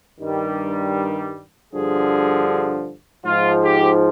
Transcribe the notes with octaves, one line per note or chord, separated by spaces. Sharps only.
G2 D#3 G3
G2 D3 F3 G#4
G#2 F3 F4
G4